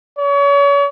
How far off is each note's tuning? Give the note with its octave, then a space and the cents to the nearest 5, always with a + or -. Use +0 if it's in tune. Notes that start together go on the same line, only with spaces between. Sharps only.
C#5 +35